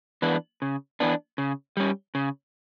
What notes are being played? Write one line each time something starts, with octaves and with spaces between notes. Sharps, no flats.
E3 B3 D4
C#3
E3 B3 D4
C#3
G3 C#4
C#3